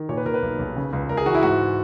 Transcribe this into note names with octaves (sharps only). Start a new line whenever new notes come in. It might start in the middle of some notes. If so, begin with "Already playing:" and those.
Already playing: D#3
A#2 C#5
B4
A#2 A#4
B4
B1
B1
C#3
C#2
C#2 A#4
G#4
E3 F#4
E4
G#2 F#4